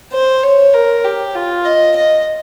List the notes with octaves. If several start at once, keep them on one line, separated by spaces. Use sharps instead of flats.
C5
C#5
A#4
G4
F4
D#5
D#5